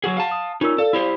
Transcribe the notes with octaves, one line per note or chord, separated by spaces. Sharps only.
F#3 F#4 G#4 F#5
F5 A5
D#6
C#4 D#4 F4 A#4 E6
A4 D5 F5
E4 G4 C5